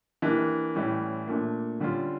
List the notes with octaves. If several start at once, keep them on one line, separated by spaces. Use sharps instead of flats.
E3 A#3 D4 G4
A2 E3 G3 C#4
A#2 A3 D4
D3 G3 C#4 F4